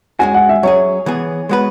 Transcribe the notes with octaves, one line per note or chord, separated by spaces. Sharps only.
G#3 C#4 F#4 G#5
F#5
E5
F#3 C#4 G#4 C#5
E3 B3 G#4
G#3 B3 F#4 B4